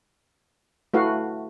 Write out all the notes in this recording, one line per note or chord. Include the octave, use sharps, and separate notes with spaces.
A3 E4 F#4 B4 F5